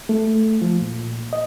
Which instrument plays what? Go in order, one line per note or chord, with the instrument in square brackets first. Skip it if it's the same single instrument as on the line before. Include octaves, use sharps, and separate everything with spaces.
[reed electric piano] A3
F3
A#2
D#5